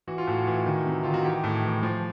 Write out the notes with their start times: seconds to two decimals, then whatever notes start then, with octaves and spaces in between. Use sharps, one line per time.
0.07 E3 F#4
0.18 F4
0.27 A2 F#4
0.47 E3
0.66 D#3
0.86 C3
1.03 D#3 F4
1.14 F#4
1.24 E3 G4
1.44 A2
1.63 E3
1.83 F3